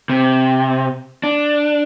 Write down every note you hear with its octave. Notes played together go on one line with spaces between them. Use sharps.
C3
D4